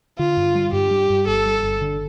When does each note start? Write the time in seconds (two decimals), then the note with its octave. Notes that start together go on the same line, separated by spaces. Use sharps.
0.19 D3 F4
0.37 G2
0.55 G3
0.73 G2 G4
0.91 G3
1.10 G2
1.27 G1 A4
1.46 G3
1.63 G1
1.81 D3